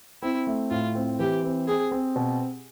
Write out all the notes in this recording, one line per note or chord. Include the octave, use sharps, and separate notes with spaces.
C4 E4
A3
A2 F4
C4
E3 G4
C4
C4 G#4
C4
B2